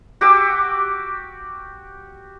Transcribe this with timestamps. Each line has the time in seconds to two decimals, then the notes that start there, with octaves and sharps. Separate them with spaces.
0.21 F#4 G4 D6 E6